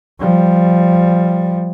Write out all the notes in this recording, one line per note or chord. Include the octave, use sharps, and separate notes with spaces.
F3 G3